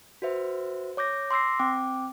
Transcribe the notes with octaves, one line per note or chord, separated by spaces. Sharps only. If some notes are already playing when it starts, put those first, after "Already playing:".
F#4 B4 C5 E5
C#5 D6 G6 A#6
C6 D6 E6 A#6 C7
C4 G5 D6